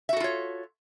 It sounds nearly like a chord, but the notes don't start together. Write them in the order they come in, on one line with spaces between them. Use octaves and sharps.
E5 F#4 A4 F4 C#5